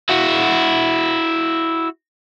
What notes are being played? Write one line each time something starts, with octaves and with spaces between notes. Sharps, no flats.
E4 F#4